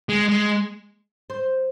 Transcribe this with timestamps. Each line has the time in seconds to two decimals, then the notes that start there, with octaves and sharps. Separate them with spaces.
0.09 G#3
0.29 G#3
1.30 C5